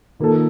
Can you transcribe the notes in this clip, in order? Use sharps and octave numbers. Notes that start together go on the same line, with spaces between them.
D#3 A#3 F4 A4